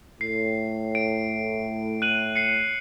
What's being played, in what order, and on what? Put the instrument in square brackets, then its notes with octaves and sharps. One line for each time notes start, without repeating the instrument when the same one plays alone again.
[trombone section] A2 [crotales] C7
[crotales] D7
F#6 D#7 F#7
C7 C#7